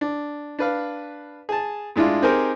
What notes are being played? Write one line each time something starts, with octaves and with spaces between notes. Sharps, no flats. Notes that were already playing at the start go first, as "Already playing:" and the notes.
D4
D4 B4 F5
G#4 A5
A2 G#3 D4 E4 F4
C4 D#4 G4 G#4 A#4 C5